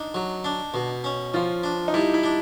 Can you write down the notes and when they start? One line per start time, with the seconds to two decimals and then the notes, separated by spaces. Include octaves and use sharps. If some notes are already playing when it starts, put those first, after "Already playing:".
Already playing: D4 D#4
0.14 F#3
0.44 D4
0.74 B2
1.04 C#4
1.34 F3 F4
1.63 D4
1.88 D#4
1.94 G3 E4
2.14 E4
2.23 D4